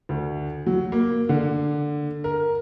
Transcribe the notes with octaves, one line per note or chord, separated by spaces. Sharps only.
D2
F#3
A#3
D3
A#4